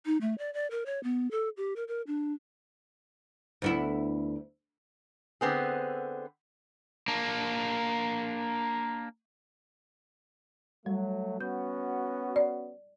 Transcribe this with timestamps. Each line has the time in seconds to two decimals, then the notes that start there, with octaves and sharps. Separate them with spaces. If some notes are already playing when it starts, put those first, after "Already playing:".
0.06 D#4
0.21 A3
0.38 D5
0.54 D5
0.71 A#4
0.86 C#5
1.03 B3
1.31 A4
1.57 G4
1.76 A#4
1.88 A#4
2.07 D4
3.62 D2 B3 E4
5.41 D3 B3 C4 G#4
7.08 A#3 D4
10.86 F#3 G3 A3
11.41 B3 C#4 F#4 G6
12.36 D5